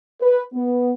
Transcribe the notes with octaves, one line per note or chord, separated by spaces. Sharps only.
B4
B3